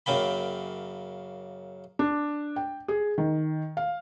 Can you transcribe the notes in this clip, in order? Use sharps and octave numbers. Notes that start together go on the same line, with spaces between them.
F#2 C#3 A#3 G5 B5
D4
G5
G#4
D#3
F5